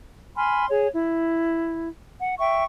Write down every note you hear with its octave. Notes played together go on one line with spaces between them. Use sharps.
G#5 B5 C6 F6
G#4 C#5
E4
F#5
E5 G5 C#6